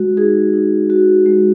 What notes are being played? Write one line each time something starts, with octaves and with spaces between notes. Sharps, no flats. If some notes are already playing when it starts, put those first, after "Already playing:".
Already playing: G#3 F#4
D#4 G#4
D#4
F#4
G#3